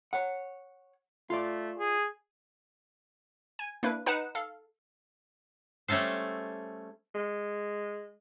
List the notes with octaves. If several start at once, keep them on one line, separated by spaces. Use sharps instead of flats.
C#5 F#5
A3 F4 D5
G#4
G#5
A#3 D4 E4 B4
D#4 B4 F#5 F#6 E7
A4 F5
G3 A3 C#4 A4 C5
G#3